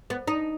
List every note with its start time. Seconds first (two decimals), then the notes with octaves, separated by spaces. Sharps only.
0.10 B3
0.28 D#4